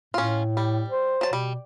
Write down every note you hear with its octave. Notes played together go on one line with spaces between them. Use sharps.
A2 C#4 F4
G3
C5
F#3 A5
B2 G3